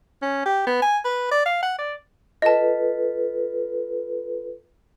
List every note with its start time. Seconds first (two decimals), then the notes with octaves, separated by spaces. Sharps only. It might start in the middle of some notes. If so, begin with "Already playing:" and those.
0.22 C#4
0.46 G4
0.67 B3
0.82 G#5
1.05 B4
1.31 D5
1.46 F5
1.63 F#5
1.78 D5
2.42 F4 A4 B4 D#5 A5